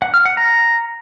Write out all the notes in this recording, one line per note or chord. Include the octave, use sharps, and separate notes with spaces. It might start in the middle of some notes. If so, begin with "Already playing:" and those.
F#5
F6
F#5
A#5